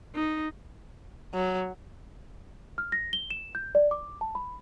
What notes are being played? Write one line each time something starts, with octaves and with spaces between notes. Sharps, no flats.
D#4
F#3
F6
A#6
G7
E7
G6
D5
D6
A5
B5